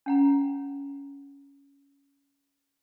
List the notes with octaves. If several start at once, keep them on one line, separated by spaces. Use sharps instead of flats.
C#4 F#5 A#5